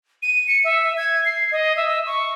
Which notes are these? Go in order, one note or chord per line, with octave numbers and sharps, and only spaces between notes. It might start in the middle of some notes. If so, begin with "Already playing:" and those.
D#7
C#7
E5
G#6
C7
D#5
E5
E6
C#6